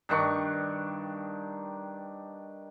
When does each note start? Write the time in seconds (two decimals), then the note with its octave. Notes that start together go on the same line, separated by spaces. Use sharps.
0.09 G2 D#3 D4 C#6